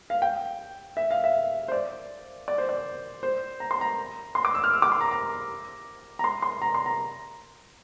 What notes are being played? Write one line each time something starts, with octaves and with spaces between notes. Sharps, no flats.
F5
G5
E5
F5
E5
C5
D5
D5
C5
D5
C5
A#5
C6
A#5
C6
D6
E6
F6
E6
D6
C6
A#5
A#5
A#5
C6
C6
A#5
C6
A#5